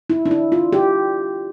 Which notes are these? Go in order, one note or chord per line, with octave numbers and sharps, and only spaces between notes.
E4
D4
E4
F4
G4